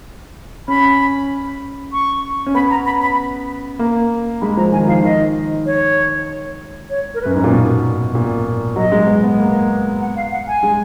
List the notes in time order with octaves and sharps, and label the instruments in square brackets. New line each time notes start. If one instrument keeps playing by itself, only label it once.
[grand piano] C#4 [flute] B5
[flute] C#6
[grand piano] C#4
[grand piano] B3 [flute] B5
[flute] A#5
B5
B5
[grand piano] A#3
[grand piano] G#3 [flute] B5
[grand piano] F3 [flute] A#5
[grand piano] D#3 [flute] G#5
[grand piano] F3 [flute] F5
[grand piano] D#3 [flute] D#5
[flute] C#5
C#5
A#4
[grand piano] F#2 [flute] B4
[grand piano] G#2
A#2
B2
A#2
[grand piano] F#3 [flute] D#5
[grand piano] G#3
B3
B3
A#3
[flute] F#5
F5
F#5
G#5
[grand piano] G#3